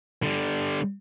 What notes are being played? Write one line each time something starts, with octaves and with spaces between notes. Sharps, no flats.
D3 G3